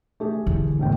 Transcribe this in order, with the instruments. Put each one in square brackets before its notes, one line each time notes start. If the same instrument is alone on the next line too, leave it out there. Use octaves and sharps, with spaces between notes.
[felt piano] A3 G4 G#4
[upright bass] D3 E3
[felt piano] E1 A2 G5